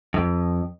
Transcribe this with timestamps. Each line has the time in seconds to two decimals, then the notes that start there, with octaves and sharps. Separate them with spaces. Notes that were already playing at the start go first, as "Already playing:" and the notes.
0.14 F2